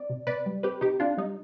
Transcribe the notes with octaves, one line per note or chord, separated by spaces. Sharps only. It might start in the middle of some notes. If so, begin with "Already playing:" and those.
Already playing: C4 D5
C3
C3 B4 D5
G3
C4 G4 B4
C3 D#4 G4
C3 D4 F4
G3 D#4